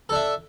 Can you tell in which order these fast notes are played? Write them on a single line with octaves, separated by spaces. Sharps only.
A4 D4 E5